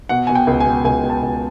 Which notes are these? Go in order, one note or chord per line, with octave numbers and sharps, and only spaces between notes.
B2 F#5
B2 G#5
G5
C#2
G#5
B2
C#2 G#5
B2
A5
C#2